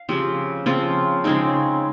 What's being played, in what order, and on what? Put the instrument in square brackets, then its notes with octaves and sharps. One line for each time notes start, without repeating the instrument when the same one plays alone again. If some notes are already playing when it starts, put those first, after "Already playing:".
Already playing: [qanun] F5
C#3 F3 C4 G4
C#3 F3 C4 F4
C#3 G#3 C4 D#4